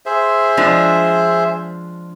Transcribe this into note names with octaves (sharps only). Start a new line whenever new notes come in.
G#4 C5 E5
F3 G#3 D4